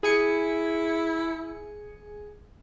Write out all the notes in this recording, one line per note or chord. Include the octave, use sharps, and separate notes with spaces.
E4 G#4 G#5 C#7